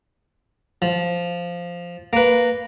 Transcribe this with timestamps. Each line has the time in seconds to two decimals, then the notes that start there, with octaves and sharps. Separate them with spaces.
0.82 F3
2.13 A#3 B4